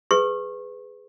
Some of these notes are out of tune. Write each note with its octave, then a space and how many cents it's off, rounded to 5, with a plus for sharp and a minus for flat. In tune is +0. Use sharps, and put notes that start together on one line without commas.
G#4 +0 B4 +20 C#6 -30